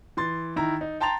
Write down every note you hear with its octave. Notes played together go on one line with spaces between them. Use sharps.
E3 C6 A6
D#3 E4 A#5
D#4
G5 A5 A#5 C6 A6 F7